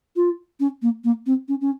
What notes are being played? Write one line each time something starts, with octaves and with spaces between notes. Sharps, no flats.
F4
C#4
A#3
A#3
C4
C#4
C#4